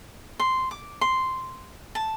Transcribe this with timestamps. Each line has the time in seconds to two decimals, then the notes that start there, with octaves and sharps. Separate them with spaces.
0.40 C6
0.71 D6
1.01 C6
1.95 A5